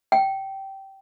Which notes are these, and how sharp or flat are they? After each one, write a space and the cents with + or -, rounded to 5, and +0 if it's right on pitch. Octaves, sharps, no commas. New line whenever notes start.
G5 -15